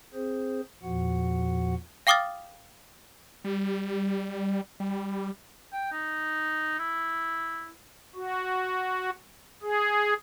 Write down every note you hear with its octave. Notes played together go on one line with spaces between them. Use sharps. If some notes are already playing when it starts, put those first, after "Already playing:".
C4 G#4 C5
E2 A#2 F3 F#4 F#5
F5 G5 D6 D#6 F6 A6
G3
G3
G5
D#4
E4
F#4
G#4